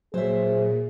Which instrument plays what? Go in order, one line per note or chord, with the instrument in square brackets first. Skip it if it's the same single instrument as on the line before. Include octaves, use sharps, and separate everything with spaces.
[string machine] A#2 [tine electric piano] F#3 [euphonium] G#4 [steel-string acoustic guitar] C5 E5